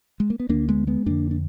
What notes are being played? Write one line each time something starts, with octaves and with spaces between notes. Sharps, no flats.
G#3
A#3
B3
D2 D3 A#3 D4
G#3 B3
G#3 B3
F2 D3 A#3 D4
D4